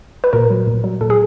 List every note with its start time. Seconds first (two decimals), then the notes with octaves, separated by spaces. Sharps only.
0.24 B4
0.33 A#2 A#4
0.50 F#3
0.67 A#2
0.84 F#3
1.01 A#2 A4
1.10 G#4